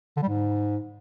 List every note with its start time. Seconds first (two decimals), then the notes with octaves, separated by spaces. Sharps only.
0.17 D3
0.22 G3
0.28 G#2